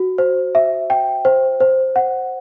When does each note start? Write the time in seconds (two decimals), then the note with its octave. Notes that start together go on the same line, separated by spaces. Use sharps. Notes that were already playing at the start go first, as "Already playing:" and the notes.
Already playing: F#4
0.18 C5
0.55 E5
0.90 G5
1.25 C5
1.60 C5
1.96 F#5